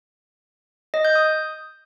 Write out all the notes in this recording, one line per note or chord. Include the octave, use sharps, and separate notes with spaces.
D#5
G6
D#6